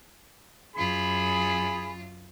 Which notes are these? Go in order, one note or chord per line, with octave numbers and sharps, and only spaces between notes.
F#2 F4 G#4 B5